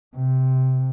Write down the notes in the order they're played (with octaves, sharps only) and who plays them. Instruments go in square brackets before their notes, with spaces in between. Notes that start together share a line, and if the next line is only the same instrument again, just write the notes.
[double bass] C3